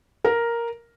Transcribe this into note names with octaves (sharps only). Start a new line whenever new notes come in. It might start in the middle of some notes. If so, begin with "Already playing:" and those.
A#4